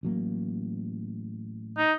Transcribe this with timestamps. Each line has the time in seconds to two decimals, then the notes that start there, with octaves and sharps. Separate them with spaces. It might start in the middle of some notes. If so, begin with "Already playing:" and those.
0.03 A1 F#3 A#3
1.78 D#4